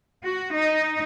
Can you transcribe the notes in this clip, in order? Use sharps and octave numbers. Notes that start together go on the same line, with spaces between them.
F#4
D#4